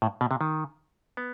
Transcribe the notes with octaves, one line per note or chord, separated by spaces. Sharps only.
A2
B2
C3
D#3
B3